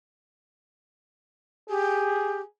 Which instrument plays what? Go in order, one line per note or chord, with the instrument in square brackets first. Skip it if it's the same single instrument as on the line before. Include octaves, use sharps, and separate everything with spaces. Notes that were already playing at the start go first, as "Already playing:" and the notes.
[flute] G4 [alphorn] G#4